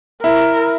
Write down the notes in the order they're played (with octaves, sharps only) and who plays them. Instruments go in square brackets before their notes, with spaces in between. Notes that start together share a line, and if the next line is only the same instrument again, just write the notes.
[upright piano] E4 [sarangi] A#4